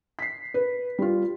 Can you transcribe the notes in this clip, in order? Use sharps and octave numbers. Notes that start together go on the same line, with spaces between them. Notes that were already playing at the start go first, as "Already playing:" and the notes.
B6 C7
B4
G3 F4